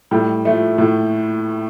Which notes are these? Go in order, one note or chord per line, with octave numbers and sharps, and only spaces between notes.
A2 G3
F3 A3
A2